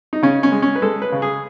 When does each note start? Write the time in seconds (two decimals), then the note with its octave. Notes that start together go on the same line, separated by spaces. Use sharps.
0.13 D#4
0.22 C#3 C#4
0.43 C#4
0.52 G#3
0.62 C#4
0.76 B4
0.82 G#3 A4
1.02 B4
1.12 C#3
1.22 G#4